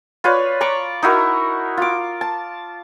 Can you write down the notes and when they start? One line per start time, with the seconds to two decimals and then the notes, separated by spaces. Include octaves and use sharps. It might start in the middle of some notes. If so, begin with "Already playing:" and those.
0.24 F4 B4 C#5 D5
0.61 A#5 B5 C#6 D6
1.03 D#4 E4 F#4 A#4
1.77 F4 D6
2.21 A5